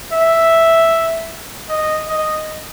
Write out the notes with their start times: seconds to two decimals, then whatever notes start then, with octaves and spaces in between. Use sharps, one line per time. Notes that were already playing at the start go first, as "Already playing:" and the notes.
0.12 E5
1.69 D#5
2.08 D#5